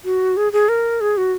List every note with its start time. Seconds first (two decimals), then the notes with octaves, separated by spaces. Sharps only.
0.05 F#4
0.37 G#4
0.53 G#4
0.69 A#4
1.01 G#4
1.17 F#4